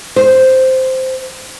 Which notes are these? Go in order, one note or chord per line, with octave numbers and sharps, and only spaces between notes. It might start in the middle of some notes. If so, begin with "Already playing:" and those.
C5